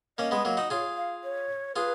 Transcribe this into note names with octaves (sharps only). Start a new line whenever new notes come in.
A#3 C#4 D#5
G#3 B3
F#3 A#3
D#4 F#4
F4 G#4 C#5
F5
C#5
F4 G#4 B4